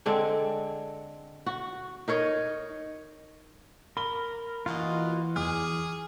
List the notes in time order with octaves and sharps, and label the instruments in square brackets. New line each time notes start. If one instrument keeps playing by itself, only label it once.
[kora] D3 G#3 C4 D4
F#4
D#4 A#4 C#5 D#5
[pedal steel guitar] A#4 [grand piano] B5 G7
[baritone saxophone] A#2 [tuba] E3 [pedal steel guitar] F4 F#4 D#5
[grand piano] E2 [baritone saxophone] G#4 [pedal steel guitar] D6 D#6 F6